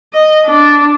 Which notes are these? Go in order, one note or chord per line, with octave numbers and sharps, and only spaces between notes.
D#5
D4